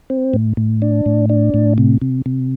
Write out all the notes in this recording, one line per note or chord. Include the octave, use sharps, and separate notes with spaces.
C4
A2
A2
D4
A2
D4
A2
C3
C3
C3